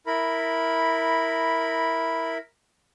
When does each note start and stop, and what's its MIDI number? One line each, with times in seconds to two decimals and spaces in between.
0.07 2.38 64
0.07 2.38 70
0.07 2.38 83